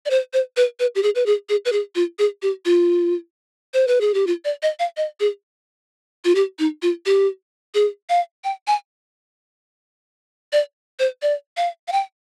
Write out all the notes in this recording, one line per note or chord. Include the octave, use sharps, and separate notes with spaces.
D5
C5
C5
B4
B4
G4
G#4
B4
G#4
G#4
B4
G#4
F4
G#4
G4
F4
C5
B4
G#4
G4
F4
D5
D#5
F5
D#5
G#4
F4
G4
D#4
F4
G4
G#4
F5
G5
G#5
D5
C5
D5
F5
F5
G5